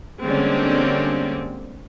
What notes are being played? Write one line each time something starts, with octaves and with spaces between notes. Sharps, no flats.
D3 G3 G#3 A#3 C4 C#4